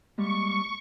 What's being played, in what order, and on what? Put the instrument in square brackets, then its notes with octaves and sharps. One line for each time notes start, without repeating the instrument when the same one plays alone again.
[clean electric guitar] G3 G#3 A#3 [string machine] C#6